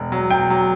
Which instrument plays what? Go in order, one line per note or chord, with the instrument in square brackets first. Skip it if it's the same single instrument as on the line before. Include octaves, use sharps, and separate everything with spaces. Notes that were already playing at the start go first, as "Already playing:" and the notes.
Already playing: [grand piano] E1
F#3
E1 G5
F#3